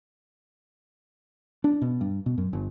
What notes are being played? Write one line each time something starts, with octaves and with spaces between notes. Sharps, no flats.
D4
B2
G2
B2
F#2
G1